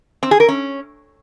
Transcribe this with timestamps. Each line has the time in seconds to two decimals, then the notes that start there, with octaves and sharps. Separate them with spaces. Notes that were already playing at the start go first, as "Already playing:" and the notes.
0.23 C4
0.31 G#4
0.40 A#4
0.49 C#4